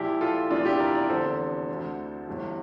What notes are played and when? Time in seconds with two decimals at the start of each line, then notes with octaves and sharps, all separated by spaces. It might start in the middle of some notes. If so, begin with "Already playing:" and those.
Already playing: A#1 A#2 E4 G4
0.21 F4 A4
0.50 F1 E2 E3 D4 F4
0.65 E4 G4
0.80 A#4 D5
0.95 A#4 D5
1.09 F1 E2 D3 A4 C5
1.68 D2 D3
2.27 G1 G2 E3